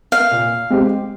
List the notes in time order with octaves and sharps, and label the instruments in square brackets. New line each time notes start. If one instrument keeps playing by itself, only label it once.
[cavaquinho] F5
[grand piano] A#2
G#3 C4 G4